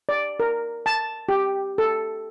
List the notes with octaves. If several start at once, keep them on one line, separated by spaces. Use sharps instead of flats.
D5
A#4
A5
G4
A4